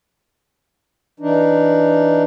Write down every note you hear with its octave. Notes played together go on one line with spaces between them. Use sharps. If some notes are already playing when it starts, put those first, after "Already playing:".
E3 D4 D#4